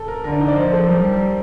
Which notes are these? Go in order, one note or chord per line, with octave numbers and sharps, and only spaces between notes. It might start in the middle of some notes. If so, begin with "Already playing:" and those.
Already playing: A4
A#4
D3 A#4
D4
D#4
D5
F3 C5
A4
G3 A#4